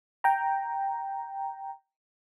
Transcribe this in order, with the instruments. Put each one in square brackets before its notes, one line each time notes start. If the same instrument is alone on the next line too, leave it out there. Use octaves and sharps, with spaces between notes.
[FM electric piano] G5 A#5